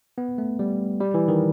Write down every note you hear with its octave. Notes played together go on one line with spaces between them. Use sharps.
B3
A3
G3
G3
E3
D#3